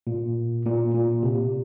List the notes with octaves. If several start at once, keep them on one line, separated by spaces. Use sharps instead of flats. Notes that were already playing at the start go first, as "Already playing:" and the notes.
A#2
A#2
A#2
C3